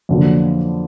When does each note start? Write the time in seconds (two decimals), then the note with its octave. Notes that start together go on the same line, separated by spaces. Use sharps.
0.09 F2 D3 F#3 A#3